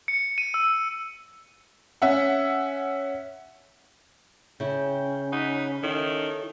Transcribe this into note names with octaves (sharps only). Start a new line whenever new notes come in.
C#7
D#7
E6
C#4 E5 F#5
C#3 C#4 E4 G5
D#4 C#5 F#5 B5
D#3 E4 A4 C#5